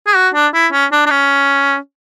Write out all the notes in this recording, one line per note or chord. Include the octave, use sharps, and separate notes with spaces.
G#4
F#4
D4
E4
C#4
D4
D4
C#4